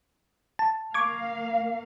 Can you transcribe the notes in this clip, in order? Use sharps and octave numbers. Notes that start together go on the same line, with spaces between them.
A5
A#3 F5 C#6 D6 G#6